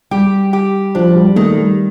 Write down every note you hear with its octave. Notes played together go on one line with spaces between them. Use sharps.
G3 G4
G4
F3 D4
F3
G3
D#3 A3
G3